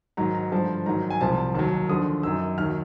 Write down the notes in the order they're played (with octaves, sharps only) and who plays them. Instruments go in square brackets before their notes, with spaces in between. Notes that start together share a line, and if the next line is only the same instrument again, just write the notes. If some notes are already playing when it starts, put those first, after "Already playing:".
[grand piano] G#2 D#3 F#3 A#5
A#5
G2 D3 F3 A5
G#2 D#3 F#3 A#5
G#5
C2 C3 F3 A5
D#2 D#3 F#3 A5
D#2 D3 F3 D#6
F#2 D#3 F#3 E6
D#2 D#3 F#3 F6